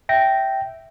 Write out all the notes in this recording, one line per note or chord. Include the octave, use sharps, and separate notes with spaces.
E5 G5 A#6